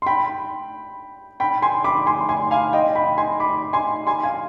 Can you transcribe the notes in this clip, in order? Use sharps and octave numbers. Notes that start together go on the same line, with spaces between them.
C6
G5 B5
G5 B5
G#5 C6
B5 D6
G#5 C6
G#5 C6
F5 G#5
D#5 G5
G5 B5
G#5 C6
B5 D6
G#5 C6
G#5 C6
F5 G#5